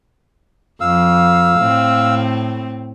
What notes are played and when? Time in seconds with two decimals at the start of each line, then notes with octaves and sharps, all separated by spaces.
0.81 F2 F5 E6
1.59 A2 C4